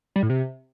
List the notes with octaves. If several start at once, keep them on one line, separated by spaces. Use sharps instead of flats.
G3
A2
C3